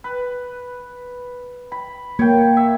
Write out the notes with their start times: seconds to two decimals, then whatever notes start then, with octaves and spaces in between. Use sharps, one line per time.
0.04 B4
1.72 B5
2.19 A#3 C#5 G5
2.57 E5